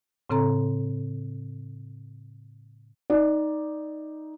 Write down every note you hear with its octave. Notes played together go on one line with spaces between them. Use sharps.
A2 C#3 C4 A4 A#5
D#4 D5